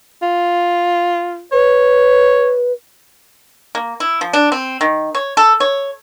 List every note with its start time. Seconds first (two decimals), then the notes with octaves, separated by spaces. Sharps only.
0.22 F4
1.52 B4 C#5
3.75 A#3
4.00 E4
4.21 F3
4.33 D4
4.52 C4
4.81 D#3
5.15 C#5
5.37 A4
5.60 C#5